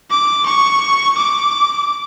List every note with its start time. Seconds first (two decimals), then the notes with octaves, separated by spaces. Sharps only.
0.11 D6
0.46 C#6
1.18 D6